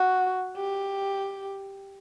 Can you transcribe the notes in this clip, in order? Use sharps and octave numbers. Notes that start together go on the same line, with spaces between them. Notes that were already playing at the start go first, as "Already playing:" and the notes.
Already playing: F#4
G4